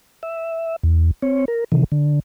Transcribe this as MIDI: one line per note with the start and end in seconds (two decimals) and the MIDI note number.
0.23 0.76 76
0.84 1.11 40
1.22 1.45 60
1.22 1.45 73
1.48 1.64 70
1.72 1.84 48
1.72 1.84 51
1.72 1.84 52
1.92 2.20 50